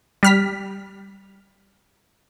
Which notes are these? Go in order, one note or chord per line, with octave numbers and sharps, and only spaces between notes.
G3 F6 B6